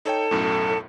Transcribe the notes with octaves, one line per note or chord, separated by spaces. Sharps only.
D#4 A4 C#5 G5
B1 F#2 A2